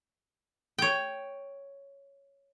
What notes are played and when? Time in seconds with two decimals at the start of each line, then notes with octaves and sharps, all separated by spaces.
0.78 C#5 G5